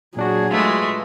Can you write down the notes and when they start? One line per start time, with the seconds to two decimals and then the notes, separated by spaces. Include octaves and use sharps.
0.16 A#2 F#3 D4 F#4 G#4
0.51 G#3 A3 F4 B4